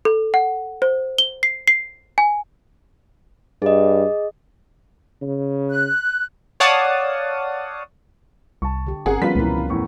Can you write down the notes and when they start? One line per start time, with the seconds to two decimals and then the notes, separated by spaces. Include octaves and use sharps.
0.05 A4
0.34 F#5
0.82 C5
1.18 G7
1.43 C7
1.68 C7
2.18 G#5
3.62 G2 G#4 D#5
5.22 C#3
5.70 F#6
6.60 C#5 D5 F5 F#5 A5 D#6
8.62 C2 A5 C#6
8.87 D3 G4
9.06 G1 C4 C#4 G#4 A#4 F#5
9.22 F3 G3 B3 C#4 F4 B4 B6
9.35 E1 C#2 E3 G3 A#4
9.70 E2 A2 C#6